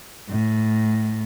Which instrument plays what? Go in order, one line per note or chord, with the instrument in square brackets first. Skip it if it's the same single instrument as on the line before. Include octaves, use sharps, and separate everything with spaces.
[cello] A2